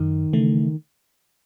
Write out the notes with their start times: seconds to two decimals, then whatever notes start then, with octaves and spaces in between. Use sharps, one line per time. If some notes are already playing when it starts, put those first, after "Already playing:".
Already playing: F#2 D#3
0.33 C#3 E3 A3